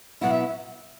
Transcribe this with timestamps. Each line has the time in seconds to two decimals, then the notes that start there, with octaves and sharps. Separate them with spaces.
0.21 B2 F#3 B3 E4 F#5
0.31 E5